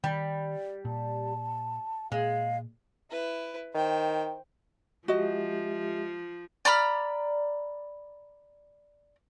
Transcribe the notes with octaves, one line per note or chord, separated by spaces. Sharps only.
D#3 G3
A#2 A5
A#2 G#3 F5
E4 B4
D#3 C5 G5
F3 G#3 F#4 G4 D#5 E5
D5 A#5 B5 F6